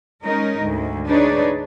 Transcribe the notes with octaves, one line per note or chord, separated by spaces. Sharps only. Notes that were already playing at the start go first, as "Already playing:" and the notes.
G#3 C#4 D#4 A#4
D2 G#2
D4 D#4 G#4 B4 C#5 D5